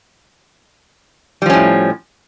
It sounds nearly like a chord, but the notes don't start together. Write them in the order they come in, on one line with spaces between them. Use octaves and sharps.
G3 F3 C#4 A2